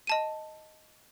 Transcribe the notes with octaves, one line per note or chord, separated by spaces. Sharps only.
D#5 A5 D#7